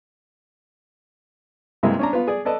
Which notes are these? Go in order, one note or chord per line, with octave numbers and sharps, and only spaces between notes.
G2 C3 G#3 A#3 E4
C#4 D4 A#5
B3 F4
G#4 D5
A4 B4 D5 D#5 A5